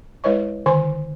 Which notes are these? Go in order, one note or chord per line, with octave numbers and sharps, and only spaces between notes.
G#3 E4 B4 C#5 D#5 C#6
D3 D#3 C5 G#5 C6 C#6